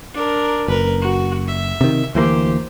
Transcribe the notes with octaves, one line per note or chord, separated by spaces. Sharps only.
D4 A#4
F#1 A#4 B4
F#4
E5
C3 D#3
D2 E3 A#3 G4 C5